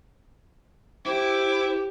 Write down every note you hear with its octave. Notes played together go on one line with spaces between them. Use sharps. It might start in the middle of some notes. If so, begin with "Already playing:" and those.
E4 G4 C5 D6